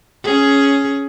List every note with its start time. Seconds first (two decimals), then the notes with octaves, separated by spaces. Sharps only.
0.23 C#4 G#4